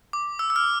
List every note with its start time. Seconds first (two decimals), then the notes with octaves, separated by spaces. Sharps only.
0.13 D6
0.39 E6
0.50 E6
0.56 F6